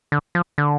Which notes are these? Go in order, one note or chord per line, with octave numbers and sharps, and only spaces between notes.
D3
F3
D3